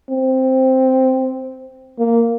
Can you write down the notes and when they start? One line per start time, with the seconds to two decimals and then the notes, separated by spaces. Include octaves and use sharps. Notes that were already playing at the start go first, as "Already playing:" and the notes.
0.10 C4
1.99 A#3